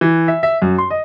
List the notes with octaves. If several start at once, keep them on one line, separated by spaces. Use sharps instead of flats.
E3
E5
E5
F#2
C6
D#5